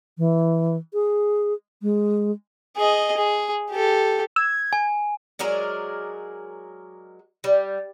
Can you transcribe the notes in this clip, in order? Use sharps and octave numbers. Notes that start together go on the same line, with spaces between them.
E3
G#4
G#3
G#4 D#5
G#4
G4 A4
E6 G#6
G#5
F#3 G#3 A#4 D5
G3